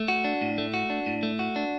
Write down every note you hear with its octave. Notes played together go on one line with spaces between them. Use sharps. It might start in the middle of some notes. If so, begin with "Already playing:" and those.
Already playing: A3
F#4
D4
A2
A3
F#4
D4
A2
A3
F#4
D4